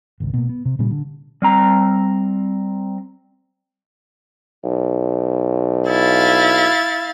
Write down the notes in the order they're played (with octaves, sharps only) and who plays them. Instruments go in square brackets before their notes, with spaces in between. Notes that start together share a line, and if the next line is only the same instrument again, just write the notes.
[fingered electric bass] G#1 C#2
B2 A#3
B3
C3
A#2 C#3 G3
D3
[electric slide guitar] G3 C4 A#5
[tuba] B1
[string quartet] E4 F5 A6